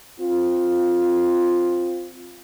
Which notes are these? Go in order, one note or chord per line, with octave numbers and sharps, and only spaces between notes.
C4 F4